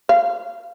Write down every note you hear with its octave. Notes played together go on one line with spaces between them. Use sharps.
F5